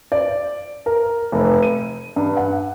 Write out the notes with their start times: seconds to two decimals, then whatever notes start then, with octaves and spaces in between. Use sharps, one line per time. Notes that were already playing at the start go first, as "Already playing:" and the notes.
0.12 D5
0.86 A#4
1.32 F1
1.63 D#7
2.16 G2
2.37 F#5